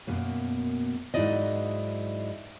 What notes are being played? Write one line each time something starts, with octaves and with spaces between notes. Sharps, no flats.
F#2 B2 A#3
G#2 F#3 D#4 E4 D5 D#5